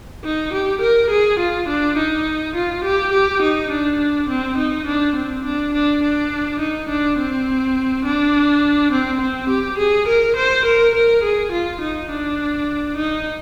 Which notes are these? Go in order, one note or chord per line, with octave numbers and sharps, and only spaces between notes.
D#4
G4
A#4
G#4
F4
D4
D#4
F4
G4
G4
D#4
D4
C4
D#4
D4
C4
D4
D4
D4
D#4
D4
C4
D4
C4
C4
G4
G#4
A#4
C5
A#4
A#4
G#4
F4
D#4
D4
D#4